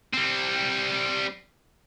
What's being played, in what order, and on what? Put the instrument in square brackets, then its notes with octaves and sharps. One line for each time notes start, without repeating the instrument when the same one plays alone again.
[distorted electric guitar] G3 C4